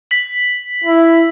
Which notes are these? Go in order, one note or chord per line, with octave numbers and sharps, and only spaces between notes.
B6 F#7
E4